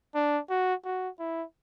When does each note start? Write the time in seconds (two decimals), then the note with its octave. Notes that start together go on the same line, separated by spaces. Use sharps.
0.15 D4
0.50 F#4
0.85 F#4
1.19 E4